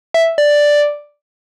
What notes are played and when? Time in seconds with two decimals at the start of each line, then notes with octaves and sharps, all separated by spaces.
0.14 E5
0.38 D5